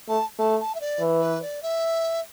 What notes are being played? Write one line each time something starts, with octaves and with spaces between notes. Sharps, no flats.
A3 A5
A3 A5
A5
E5
D5
E3
B4
D5
E5